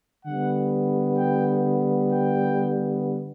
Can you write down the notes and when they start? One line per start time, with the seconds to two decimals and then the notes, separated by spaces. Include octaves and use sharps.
0.24 D3 G3 B3 F#5
1.17 G5
2.10 G5